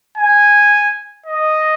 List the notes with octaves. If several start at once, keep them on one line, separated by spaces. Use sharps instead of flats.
G#5
D#5